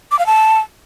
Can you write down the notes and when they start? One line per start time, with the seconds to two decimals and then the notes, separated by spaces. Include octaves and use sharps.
0.11 D6
0.19 F5
0.26 A5